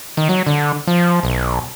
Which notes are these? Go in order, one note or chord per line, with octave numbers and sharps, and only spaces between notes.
D#3
F#3
D3
F3
B1